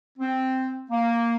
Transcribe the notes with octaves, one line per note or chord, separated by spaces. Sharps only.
C4
A#3